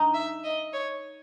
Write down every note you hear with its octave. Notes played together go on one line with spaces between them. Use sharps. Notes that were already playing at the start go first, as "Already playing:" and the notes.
Already playing: D#4
E5
D#5
C#5